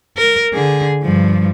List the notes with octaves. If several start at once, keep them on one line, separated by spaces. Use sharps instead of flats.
A#4
D3 G#4
G2 F3